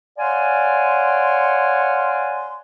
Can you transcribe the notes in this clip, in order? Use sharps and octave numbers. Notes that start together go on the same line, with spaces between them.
C#5 D5 F5 F#5 G#5 C6